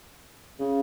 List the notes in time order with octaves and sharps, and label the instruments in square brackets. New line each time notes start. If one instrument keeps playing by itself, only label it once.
[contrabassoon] C#3